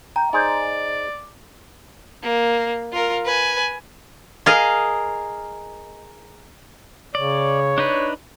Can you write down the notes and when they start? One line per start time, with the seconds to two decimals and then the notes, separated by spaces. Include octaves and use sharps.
0.16 G5 A#5
0.33 D#4 G#4 C5 D5
2.23 A#3
2.93 F4 A#4
3.25 B4 G#5
4.46 G#4 A#4 D#5 F5
7.15 C#3 C#5 D5
7.78 D4 D#4 B4